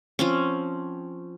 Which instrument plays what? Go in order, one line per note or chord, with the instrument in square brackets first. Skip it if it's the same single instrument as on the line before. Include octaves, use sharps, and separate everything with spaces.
[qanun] F3 C4 C#4